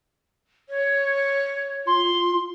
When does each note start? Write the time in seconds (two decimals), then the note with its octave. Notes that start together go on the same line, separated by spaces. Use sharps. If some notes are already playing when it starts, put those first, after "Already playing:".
0.69 C#5
1.87 F4 C6